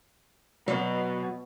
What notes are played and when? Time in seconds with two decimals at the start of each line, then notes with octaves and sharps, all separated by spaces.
0.68 B2 F#3